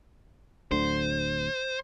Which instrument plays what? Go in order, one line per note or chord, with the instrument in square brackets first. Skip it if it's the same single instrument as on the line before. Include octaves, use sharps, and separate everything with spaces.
[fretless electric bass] D1 D2 D3 [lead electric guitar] C5